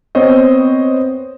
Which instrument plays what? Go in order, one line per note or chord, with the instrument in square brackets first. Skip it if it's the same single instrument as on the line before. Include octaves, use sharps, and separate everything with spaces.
[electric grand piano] B3 C4 C5 C#5 D#5